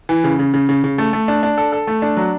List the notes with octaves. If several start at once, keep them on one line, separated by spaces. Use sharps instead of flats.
E3
C#3
C#3
C#3
C#3
C#3
A3
A3
D4
D4
A4
A4
A3
D4
F#3